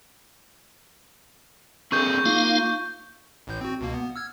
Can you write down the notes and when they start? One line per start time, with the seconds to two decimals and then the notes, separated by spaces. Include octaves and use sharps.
1.92 C4 G#4 A4 C#6 G6
2.25 A#3 D#4 F4 F5
3.47 A1 A2 G6
3.61 C4 F#4
3.81 C#2 B2 A#3
3.94 B3
4.16 E6 F6 G#6